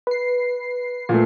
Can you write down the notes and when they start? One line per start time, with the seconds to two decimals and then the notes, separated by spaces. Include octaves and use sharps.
0.07 B4 C7
1.09 A#2 A3